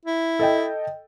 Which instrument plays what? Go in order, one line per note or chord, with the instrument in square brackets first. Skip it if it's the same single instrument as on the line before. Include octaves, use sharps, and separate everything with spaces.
[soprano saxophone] E4
[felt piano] A4 D#5 G5